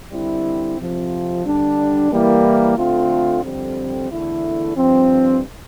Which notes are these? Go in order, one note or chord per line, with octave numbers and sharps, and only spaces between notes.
D3 G3 C4 E4
F2 C3 F3 C4 F4
D3 G3 D4
E3 G3 A#3 E4
D3 A3 C4 F4
F2 D3 G3 C4
E2 D3 A3 E4
G2 F3 C4